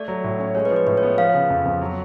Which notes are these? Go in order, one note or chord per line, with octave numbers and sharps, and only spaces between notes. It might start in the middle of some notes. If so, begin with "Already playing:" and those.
Already playing: A3 D5
F#3
A2
C#4
G#3 C#5
B4
F3
B4
A2 B4
C#5
B3
F3 F5
C#3
F2
F2
F#3